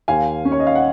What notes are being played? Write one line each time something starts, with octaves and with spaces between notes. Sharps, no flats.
D#2 F5 G#5
C#4
C#5
D#5
F5
F#5